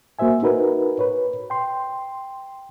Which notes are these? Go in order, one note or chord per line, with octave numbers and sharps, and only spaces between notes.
A#3 F#4 C5 E5 G#5
D#4 F#4 A#4 B4
B4 C#5
G5 C6